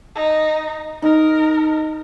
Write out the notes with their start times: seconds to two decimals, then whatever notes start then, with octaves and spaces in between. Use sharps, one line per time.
0.15 D#4
1.02 D#4 A#4